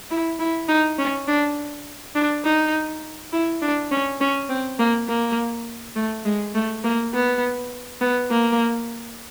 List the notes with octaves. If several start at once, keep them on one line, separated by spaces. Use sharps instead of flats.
E4
E4
D#4
C#4
D4
D4
D#4
E4
D4
C#4
C#4
C4
A#3
A#3
A3
G#3
A3
A#3
B3
B3
A#3